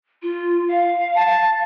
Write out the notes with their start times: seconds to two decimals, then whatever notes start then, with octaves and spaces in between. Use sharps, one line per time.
0.22 F4
0.68 F5
1.15 A5